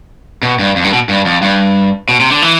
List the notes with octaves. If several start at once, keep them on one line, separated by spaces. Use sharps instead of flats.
B2
G2
F2
G2
B2
G2
F2
G2
B2
C3
D3
E3